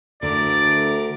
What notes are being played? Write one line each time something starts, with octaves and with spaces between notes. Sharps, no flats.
D2 D3 A#4 D5 D6